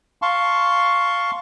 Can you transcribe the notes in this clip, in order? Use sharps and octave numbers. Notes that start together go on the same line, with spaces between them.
F5 A5 C6 C#6